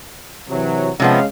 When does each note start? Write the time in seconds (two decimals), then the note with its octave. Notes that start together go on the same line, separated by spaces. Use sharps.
0.49 C3 E3 F#3
1.00 C3 F3 G#3 B3 C#4 F5